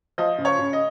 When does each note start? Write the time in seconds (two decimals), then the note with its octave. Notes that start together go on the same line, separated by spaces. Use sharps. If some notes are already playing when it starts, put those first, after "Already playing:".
0.18 F3 D#5
0.38 C#3
0.45 C#5
0.59 C#3
0.73 D#5